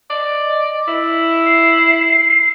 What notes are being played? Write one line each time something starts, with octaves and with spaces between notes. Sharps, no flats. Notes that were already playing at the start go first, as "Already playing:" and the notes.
D5 D#5
E4
C7